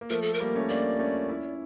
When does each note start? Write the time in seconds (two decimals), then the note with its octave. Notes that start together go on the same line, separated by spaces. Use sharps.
0.01 A#3
0.10 F3 A3 A#4
0.22 A4
0.34 A#4
0.40 G3 A#3
0.55 A3 C#4
0.69 A#3 D4 D5
0.99 A3 C#4
1.29 C#4 E4